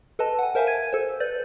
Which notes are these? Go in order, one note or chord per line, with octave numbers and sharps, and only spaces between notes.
A4 B4 D#5 A5
F#5 G#5
A#4 C5 E5 F5 G#5 A5
G#6 D#7
A4 C5
B4 D5 G6 A6